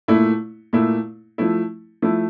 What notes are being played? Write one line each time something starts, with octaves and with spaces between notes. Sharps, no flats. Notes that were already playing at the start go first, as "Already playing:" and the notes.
A#2 A3 E4
A#2 A3 E4
F3 A3 E4
F3 A3 E4